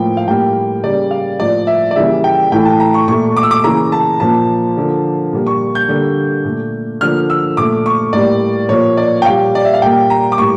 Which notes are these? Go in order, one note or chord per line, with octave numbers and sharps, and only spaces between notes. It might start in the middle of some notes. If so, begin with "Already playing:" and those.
Already playing: A2 F3 A#3 G5
F5
A2 G3 A#3 G5
C#3 G3 A#3 D5
F5
A2 F3 A#3 D5
E5
D5
C#3 E3 G3 A#3 E5
G5
A2 E3 A3 G5
A5
A#5
C#6
A#2 A3 C#6
D6
E6
D6
C#3 E3 A#3 A#5
A5
A#2 F3 A#3 A5
D3 F3 A#3
A#2 G3 A#3
C#6
G6
D3 G3 A#3
A#2 A3
D3 F3 A#3 F6
E6
A#2 A3 D6
C#6
A2 G3 A#3 D5
A#2 F3 A#3 C#5
D5
G5
A#2 G3 A#3 F5
D5
E5
F5
A#2 G3 A#3 G5
A#5
D6
A2 G3 A#3 C#6